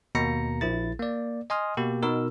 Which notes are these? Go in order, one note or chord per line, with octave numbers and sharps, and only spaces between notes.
D#2 B2 A#3 A#5 A#6 C#7
A#1 E4 A6
A#3 D5
D#5 G#5 C6 D#6 F6
B2 A#3 G4
B2 D#4 A#4 E6